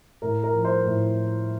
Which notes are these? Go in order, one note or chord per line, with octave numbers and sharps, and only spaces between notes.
A2 A#4
A#4
F3
C5
A2